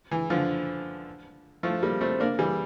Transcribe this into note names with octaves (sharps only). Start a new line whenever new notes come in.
E3
D3 F3
F3 A3
G3 A#3
A3 C4
A#3 D4
E3 G3